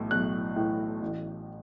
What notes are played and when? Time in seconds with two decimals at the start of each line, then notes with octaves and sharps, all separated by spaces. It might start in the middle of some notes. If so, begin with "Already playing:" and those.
Already playing: B1 A2 E3
0.11 B1 F#6
0.56 A2 E3
1.02 A1